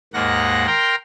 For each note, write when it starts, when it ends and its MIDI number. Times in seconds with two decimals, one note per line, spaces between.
0.13 0.66 39
0.13 0.66 44
0.13 0.66 58
0.13 0.66 78
0.13 0.66 94
0.67 0.95 70
0.67 0.95 79
0.67 0.95 82
0.67 0.95 84